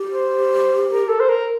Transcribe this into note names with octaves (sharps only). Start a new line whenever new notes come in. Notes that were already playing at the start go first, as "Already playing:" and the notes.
Already playing: G4
C5
A#4
A4
C5
A#4